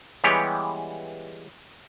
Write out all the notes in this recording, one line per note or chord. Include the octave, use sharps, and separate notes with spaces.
E3 G3 G#3 B3 G4 C#5